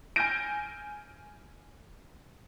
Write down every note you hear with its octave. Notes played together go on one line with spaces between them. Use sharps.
G#5 F6 G6 A#6 D7